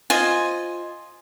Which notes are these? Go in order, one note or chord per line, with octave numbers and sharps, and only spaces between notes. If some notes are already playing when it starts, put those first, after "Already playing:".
F4 C5 D#5 G#5